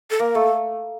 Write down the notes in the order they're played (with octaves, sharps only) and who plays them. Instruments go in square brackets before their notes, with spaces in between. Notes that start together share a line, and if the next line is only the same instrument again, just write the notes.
[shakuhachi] A4
[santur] A#3 [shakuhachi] A#4
[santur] A3 [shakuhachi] A4